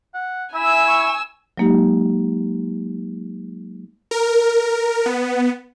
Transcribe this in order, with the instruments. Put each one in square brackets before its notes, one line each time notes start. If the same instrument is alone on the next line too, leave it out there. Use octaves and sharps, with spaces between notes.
[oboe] F#5
[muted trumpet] E4 [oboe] E5 [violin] G#5 E6
[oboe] C#6
[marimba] F#3 G#3 A#3 D#4 G4
[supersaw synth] A#4
B3